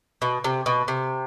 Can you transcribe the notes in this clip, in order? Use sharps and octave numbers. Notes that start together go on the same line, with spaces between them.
B2
C3
B2
C3